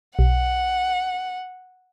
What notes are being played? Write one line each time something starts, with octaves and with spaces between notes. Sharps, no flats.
B1 F#5